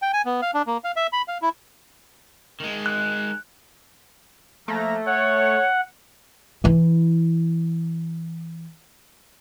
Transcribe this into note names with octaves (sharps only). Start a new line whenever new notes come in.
G5
G#5
B3
F5
D4
A#3
F5
E5
B5
F5
E4
D#3 G#3
F#6
F3 A3 A#3 A#5
C#5 F#5
E3 E4